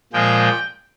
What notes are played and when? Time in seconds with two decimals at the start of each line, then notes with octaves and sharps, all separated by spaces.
0.13 A#2 F3 G#3 G5